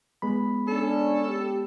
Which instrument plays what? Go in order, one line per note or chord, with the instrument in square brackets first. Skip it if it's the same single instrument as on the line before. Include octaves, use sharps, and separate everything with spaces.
[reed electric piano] G#3 B3 B5
[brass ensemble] C#4 D4 [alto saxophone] A4
[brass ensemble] G4